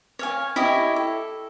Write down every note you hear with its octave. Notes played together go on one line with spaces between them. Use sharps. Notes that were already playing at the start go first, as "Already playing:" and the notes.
C#5 F5 G#5
E4 G4 C#5 D#5
A4